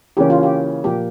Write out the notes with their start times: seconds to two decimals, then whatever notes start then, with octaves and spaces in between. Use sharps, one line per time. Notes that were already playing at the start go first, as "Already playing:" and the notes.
0.17 C#3 E3 A#3 C#4 G4
0.30 F4
0.43 G4
0.84 A#2 F3 A#3 G4